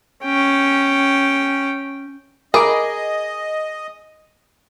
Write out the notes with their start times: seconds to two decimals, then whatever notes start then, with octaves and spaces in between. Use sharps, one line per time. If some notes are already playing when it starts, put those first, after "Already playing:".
0.25 C#4 G5
2.54 G#4 A#4 D#5 B5 D6